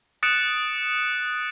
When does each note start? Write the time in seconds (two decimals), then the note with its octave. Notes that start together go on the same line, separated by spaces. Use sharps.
0.23 D#6 F#6 A6 C#7 D7 E7